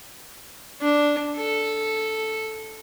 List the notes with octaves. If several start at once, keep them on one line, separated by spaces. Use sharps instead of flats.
D4
A4